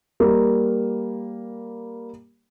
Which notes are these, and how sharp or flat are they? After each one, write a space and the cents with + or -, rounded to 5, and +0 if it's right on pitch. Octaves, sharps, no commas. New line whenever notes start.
G3 +0 A#3 +0